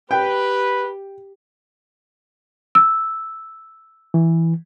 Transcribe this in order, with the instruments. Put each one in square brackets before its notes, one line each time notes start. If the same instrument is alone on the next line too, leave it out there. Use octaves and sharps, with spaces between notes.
[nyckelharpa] G4 [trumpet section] B4 [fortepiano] G5
[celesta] E6
[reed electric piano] E3